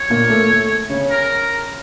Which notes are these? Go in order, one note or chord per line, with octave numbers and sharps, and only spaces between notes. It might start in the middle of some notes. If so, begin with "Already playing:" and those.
Already playing: C#5
A#2 A#3
A3
A3
C#3 C#4
A#4